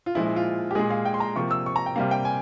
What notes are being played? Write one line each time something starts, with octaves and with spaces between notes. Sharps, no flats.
F4
A#2 F3 G#3 E4
E4
F4
G4
A#2 G#3 G#4
F5
G5
C6
A#5
C3 F3 A#3 C#6
E6
C#6
A#5
G5
C3 G3 A#3 F5
G5
G#5